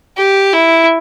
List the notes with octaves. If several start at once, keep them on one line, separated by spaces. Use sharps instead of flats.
G4
E4